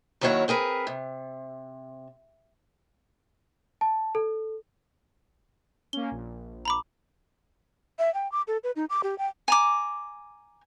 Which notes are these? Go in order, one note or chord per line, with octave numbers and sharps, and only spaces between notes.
D#2 D#3 F#3 E4 C#5 F#5
C4 G#4 A#4 B4
C3
A5
A4
A#3 C#4 G7
A#1
A#5 B5 D6
E5
G5
D6
A4
B4
D#4
D6
G4
G5
G#5 A#5 D6